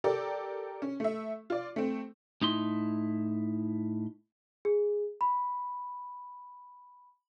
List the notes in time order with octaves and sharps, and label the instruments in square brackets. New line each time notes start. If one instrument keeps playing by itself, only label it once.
[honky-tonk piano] G4 A4 A#4 D5
C#4
A3 E5
F4 D5
A3 C4
[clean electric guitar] A2 D#4 E4 C6
[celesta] G#4
B5